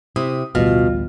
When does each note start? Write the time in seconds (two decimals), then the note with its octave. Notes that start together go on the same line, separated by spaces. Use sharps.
0.16 C3 E4 D#6
0.55 A1 D2 B2 G3 F4